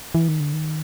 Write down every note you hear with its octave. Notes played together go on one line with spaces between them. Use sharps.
E3
D#3
D3
D#3